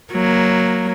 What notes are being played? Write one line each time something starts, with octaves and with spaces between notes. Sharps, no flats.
F#3 A#3